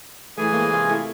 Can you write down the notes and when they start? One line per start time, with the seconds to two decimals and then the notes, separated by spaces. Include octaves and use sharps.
0.37 A2 E3 A3 G#4 G#5
0.53 G#3 A#3 C#4
0.72 C3 F4 D#5
0.89 A3 E4